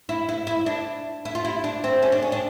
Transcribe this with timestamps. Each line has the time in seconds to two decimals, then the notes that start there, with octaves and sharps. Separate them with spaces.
0.09 E4
0.29 E4
0.47 E4
0.66 D4
1.25 E4
1.35 F4
1.45 E4
1.64 D4
1.84 C4
2.02 C#4
2.12 D4
2.22 C#4
2.32 D4